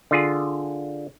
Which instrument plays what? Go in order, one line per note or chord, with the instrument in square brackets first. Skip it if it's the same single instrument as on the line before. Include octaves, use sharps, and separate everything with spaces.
[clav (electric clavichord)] D3 F4 G#4